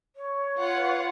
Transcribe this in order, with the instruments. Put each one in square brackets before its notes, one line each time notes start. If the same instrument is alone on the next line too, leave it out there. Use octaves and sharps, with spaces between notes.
[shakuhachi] C#5
[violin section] F4 B4 F#5